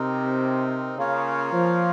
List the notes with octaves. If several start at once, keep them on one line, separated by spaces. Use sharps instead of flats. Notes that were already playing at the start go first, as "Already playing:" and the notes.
Already playing: C3 C4 D#4 A#4
C#3 A#3 F4 A#4 C#5 F5
F3